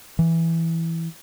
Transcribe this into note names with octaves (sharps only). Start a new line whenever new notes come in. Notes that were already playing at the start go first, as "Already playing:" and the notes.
E3